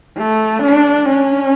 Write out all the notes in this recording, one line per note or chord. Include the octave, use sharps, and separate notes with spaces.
A3
D4
C#4